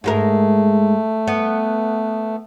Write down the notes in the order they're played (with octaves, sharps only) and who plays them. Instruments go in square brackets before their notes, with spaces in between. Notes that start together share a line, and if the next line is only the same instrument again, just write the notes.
[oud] G#2 G#3 A#4 [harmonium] A3
[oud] B3